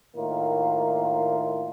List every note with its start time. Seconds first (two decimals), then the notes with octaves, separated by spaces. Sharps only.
0.15 A2 D#3 A#3 F4